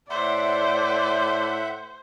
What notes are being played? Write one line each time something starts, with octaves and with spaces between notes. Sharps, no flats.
A2 C5 D5 E5 F#5